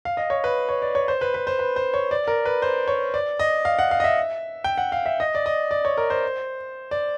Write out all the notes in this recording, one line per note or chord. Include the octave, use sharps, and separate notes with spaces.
F5
D#5
C#5
B4
C#5
D5
C#5
C5
B4
B4
C5
B4
C5
C#5
D5
A#4
B4
C5
C#5
D5
D#5
F5
F#5
F5
D#5
E5
G5
F#5
F5
E5
D#5
D5
D#5
D5
C#5
A#4
C5
D5